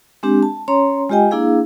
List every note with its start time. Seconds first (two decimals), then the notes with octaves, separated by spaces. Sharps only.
0.23 G#3 C4 D4 G4
0.43 A5
0.68 C#4 C#5 A#5 C6
1.10 G#3 F4 G4 D#5 G5 G#5
1.31 A#3 D4 E4 G#4 F5